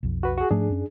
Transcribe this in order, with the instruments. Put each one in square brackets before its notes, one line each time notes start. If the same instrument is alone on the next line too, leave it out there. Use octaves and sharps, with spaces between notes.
[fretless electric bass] B1 F2
[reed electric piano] F#4 B4
F#4 G#4
[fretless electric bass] G#2 F3 A3 [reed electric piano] D4 G#4
[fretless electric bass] F#2 C#4